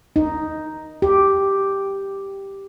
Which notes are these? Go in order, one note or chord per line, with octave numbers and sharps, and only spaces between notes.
D#4
G4